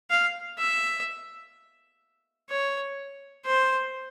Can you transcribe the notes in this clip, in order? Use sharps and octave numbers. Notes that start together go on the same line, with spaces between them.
F5
E5
C#5
C5